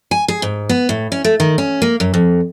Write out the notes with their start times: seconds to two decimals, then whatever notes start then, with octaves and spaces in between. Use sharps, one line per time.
0.11 G#5
0.28 G#4
0.42 G#2
0.69 B3
0.89 A2
1.12 C#4
1.24 A3
1.40 D#3
1.58 C#4
1.82 A#3
2.00 F#2
2.14 F2